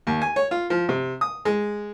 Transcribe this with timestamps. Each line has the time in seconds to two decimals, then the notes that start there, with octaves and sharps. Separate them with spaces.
0.07 D#2
0.22 G#5
0.36 C#5
0.51 F4
0.70 F3
0.89 C3
1.21 D#6
1.45 G#3